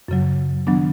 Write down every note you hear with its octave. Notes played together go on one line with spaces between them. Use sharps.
F#2 C#3 F#3
D#3 F#3 B3 D4